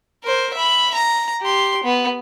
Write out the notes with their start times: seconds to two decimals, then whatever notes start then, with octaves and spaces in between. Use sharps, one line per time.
0.23 A#4 C5
0.54 E5 B5
0.94 A#5
1.41 G4 C6
1.84 B3